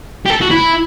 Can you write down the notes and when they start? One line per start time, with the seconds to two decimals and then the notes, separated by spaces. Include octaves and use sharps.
0.26 G4
0.30 A4
0.41 F#4
0.51 E4